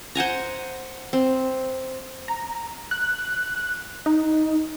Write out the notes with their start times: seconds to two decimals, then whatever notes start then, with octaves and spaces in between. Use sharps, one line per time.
0.15 C5 F#5 G#5 A#5
1.13 C4
2.28 A#5
2.91 F#6
4.06 D#4